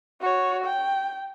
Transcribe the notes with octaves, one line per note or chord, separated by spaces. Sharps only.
F#4 C#5
G5